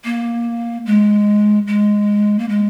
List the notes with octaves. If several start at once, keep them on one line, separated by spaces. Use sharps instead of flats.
A#3
G#3
G#3
A#3
G#3